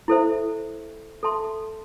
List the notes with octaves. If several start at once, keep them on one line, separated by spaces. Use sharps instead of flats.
E4 A4 C5 E5
A4 E5 A5 C6